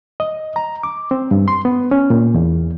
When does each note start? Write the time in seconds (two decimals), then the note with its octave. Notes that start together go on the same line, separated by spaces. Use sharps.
0.20 D#5
0.56 A#5
0.83 D6
1.11 C4
1.31 G2
1.48 C6
1.65 B3
1.91 C#4
2.10 A#2
2.34 E2